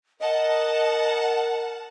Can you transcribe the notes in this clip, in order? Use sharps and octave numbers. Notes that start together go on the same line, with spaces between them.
A#4 D#5 F#5 A5